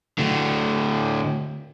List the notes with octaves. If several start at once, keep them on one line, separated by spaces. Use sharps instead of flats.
A2 D3